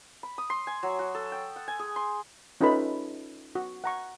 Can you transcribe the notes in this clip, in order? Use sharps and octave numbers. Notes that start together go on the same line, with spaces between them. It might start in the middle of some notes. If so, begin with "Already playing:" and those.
B5
D#6
C6
G#5
F#3
F#4
A4
G5
F#5
G#5
G#4
C6
C#4 D#4 F4 A4 B4 B5
F#4
F#5 A#5 C#6